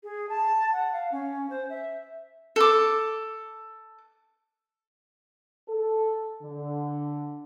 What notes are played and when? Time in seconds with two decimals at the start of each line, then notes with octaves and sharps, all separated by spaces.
0.03 G#4
0.29 A5
0.73 F#5
0.92 F5
1.12 C#4
1.50 C5
1.70 E5
2.56 A4 D6
5.68 A4
6.42 D3